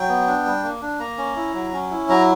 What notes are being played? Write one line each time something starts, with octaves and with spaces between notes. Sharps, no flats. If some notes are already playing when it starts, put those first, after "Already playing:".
Already playing: F#3 G5
B3
D4
G3
A#3
D4
A#3 A#5
C#4
E4
F#3
C#4
E4
F#3 A#5